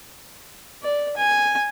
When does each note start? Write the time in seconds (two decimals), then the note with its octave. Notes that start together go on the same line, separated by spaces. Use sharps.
0.83 D5
1.16 G#5